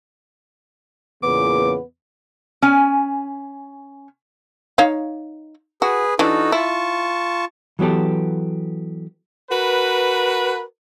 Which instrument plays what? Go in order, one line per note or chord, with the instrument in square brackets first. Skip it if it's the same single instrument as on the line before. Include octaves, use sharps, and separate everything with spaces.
[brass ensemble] E2 A#2 C#3 [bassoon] B3 [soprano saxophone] D6
[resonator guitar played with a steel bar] C#4 G#5
[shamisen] D#4 C#5 F5
[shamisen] F#4 [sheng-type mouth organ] G#4 B4
[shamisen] E3 D4 [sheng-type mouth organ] D#4 F#4 A4
[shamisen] E4 [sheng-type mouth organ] F4 A5 C#6
[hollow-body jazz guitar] E3 F#3 B3 G4 A4
[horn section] F#4 A#4 B4